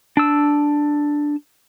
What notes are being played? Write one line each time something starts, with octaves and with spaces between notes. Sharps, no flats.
D4 E6